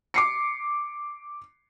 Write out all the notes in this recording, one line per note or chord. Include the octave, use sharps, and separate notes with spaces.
D6 C7 C#7